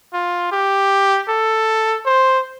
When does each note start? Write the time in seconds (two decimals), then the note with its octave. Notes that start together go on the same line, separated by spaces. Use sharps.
0.13 F4
0.52 G4
1.28 A4
2.06 C5